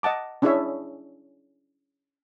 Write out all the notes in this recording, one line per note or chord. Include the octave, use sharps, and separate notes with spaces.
D#5 F#5 A5 D6
C#4 D4 E4 G#4 C#5 E5